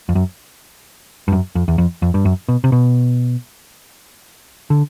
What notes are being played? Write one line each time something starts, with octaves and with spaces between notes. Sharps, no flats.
F2
F#2
G2
F#2
F2
E2
F2
F2
G2
F#2
B2
C3
B2
D3